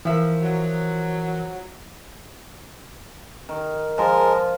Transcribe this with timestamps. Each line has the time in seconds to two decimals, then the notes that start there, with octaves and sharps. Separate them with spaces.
0.05 E3 F3 A#4 E5
0.42 F#3
3.49 D#3
3.98 F3 G#3 A#4